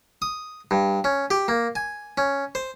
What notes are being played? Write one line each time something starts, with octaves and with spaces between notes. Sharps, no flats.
D#6
G2
C#4
G4
A#3
G#5
C#4
C5